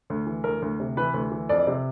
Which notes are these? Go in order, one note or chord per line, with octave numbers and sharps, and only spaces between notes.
D2
E3
D2 A#4
D2
C3
E3 B4
D2
E3
F2 D5
C3